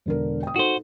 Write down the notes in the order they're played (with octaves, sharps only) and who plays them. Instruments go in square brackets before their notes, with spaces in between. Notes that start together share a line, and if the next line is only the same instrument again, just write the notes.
[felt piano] E1 D3 A#4
G5 D#6
[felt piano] D#4 A4 [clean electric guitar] F#4 C5